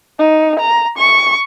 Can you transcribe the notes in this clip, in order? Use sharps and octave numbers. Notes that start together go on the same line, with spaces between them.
D#4
A#5
C#6